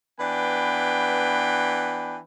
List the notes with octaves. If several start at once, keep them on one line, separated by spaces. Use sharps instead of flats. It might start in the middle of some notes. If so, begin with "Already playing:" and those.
E3 B3 D4 B4 G5